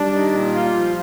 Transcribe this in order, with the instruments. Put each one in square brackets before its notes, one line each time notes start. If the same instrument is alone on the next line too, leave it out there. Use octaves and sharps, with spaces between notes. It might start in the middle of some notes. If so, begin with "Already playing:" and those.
Already playing: [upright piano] G3 [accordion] D4
[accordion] D#3
A#2
F4
F3